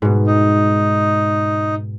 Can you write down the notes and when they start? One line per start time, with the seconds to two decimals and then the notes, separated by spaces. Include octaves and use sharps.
0.02 G#2 B2
0.27 D#4